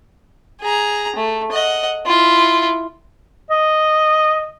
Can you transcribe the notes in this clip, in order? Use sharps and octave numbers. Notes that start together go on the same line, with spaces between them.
G#4 A#5
A3
D#5 F#5
E4 F4
D#5